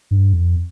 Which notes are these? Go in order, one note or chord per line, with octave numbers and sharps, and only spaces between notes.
G2
F2